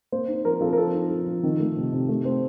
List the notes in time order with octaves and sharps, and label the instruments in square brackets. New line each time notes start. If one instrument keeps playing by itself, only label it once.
[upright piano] A#3 C5
D#4
F3 A#4
F3 A4
A#4
C4 A4
D#4
F3
F3
D#3
A3
C3
C3
A3
C4